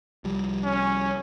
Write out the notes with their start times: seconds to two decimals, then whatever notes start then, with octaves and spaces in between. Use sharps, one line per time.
0.24 C2 F3 G3
0.64 C#4